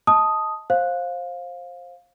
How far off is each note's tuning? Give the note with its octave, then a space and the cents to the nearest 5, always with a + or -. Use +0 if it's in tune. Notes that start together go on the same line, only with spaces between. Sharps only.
D#5 +30 A5 +0 D#6 +0
C5 +20 F5 +15